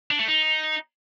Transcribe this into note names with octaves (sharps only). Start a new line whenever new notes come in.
D4
A3
D#4